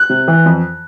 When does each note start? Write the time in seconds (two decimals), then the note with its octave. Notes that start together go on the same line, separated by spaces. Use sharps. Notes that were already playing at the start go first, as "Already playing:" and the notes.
Already playing: F#6
0.10 C3
0.28 E3
0.46 F2